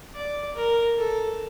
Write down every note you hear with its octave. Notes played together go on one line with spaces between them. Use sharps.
D5
A#4
A4